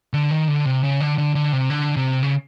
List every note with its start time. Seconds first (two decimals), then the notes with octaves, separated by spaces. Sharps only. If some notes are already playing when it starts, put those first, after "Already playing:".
0.13 D3
0.31 D#3
0.48 D3
0.65 C3
0.84 C#3
1.00 D3
1.18 D3
1.35 D3
1.53 C3
1.70 D3
1.97 C3
2.23 C#3